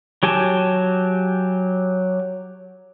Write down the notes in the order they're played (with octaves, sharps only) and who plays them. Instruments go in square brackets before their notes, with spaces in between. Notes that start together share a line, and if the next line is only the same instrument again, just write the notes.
[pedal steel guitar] F#3 G4 G#5 A5